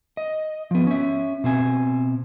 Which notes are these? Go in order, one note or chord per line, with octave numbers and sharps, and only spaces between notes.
D#5
F3 B3
C#4 E5
B2 C4 G#5